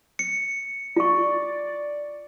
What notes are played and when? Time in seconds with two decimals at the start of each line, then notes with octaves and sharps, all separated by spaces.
0.19 C#7
0.96 F4 D5 C#6